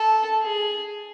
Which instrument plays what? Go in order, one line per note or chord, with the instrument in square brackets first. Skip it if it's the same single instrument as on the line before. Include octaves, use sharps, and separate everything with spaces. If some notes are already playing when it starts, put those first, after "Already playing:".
Already playing: [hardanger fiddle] A4
G#4